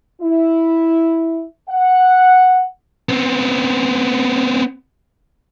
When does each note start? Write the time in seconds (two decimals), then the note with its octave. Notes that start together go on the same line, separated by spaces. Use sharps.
0.21 E4
1.68 F#5
3.09 B3 C4